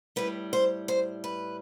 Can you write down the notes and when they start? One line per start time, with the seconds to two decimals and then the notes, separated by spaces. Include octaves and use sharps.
0.16 A2 G3 B4
0.53 C5
0.88 C5
1.24 B4